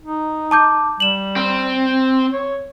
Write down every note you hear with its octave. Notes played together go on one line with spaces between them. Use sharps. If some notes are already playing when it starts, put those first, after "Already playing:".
D#4
A5 D6 G6
G3 E7 F#7
C4
C#5